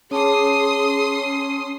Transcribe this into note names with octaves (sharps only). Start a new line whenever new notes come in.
C#4 G#4 C#5 A5 C6 D6 D#6 C7